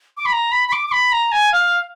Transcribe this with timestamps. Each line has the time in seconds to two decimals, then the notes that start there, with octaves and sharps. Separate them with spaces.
0.17 D6
0.26 B5
0.32 A#5
0.52 B5
0.68 B5
0.72 D6
0.88 D6
0.92 B5
1.12 A#5
1.32 G#5
1.53 F5